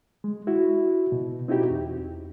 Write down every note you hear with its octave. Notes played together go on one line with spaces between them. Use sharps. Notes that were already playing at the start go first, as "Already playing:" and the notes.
G#3
E4 F#4
B2
C4 D#4 E4 F#4 G4
E2